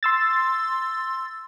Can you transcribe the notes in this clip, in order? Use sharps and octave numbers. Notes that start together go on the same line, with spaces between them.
C6 E6 A6